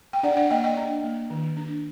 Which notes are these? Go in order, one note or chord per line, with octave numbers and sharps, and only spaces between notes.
G5
D4 D5 F#5
D5 F#5
A#3 D#5 G5
D#5 G5
D4
A#3
D#3
D4